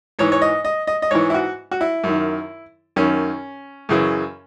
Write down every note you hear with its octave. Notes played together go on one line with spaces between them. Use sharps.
G#2 E3 C#5
C#5
D#5
D#5
D#5
D#5
G#2 E3 C#5
E4
F#4
F#4
E4
F#2 D#3
F#2 D#3 C#4
F#2 C#3 E3